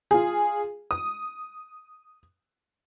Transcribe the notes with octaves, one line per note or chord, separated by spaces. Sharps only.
F4 G#4
D#6